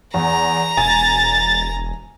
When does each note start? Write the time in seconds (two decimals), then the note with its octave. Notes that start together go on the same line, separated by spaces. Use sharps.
0.14 E2 A#5
0.77 E1 G#5 A6